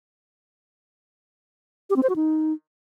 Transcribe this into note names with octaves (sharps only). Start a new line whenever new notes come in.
G4
C4
C5
F#4
D#4